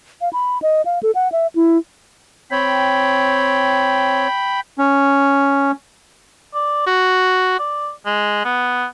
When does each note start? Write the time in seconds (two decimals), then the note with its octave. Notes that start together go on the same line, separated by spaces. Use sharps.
0.21 F5
0.33 B5
0.62 D#5
0.85 F5
1.03 A4
1.15 F#5
1.32 E5
1.56 E4
2.51 C4 C#5 G5 B5
4.78 C#4
6.54 D5
6.87 F#4
7.59 D5
8.06 G#3
8.45 B3